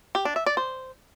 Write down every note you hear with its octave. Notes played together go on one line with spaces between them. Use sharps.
G4
D4
E5
D5
C5